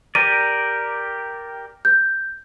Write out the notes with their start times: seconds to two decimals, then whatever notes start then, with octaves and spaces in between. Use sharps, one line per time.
0.15 G4 A#4 D5 D#7
1.85 G6